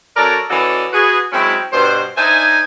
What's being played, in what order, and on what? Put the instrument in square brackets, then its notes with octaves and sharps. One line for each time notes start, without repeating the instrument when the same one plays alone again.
[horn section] F#3 C#4 A4 A#4 D5
E3 C#4 F#4 A4 D5 D#5
F#4 G#4 B4
F#3 G#3 C4 C#4 E4
G2 B2 C5
D4 D#4 C5 E5 G#5